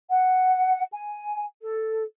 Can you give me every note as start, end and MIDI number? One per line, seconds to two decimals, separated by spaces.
0.09 0.83 78
0.92 1.45 80
1.61 2.03 69